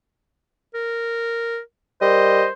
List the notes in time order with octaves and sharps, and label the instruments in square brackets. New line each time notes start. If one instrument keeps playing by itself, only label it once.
[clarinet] A#4
[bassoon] G3 [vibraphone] A#4 [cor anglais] C5 [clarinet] D#5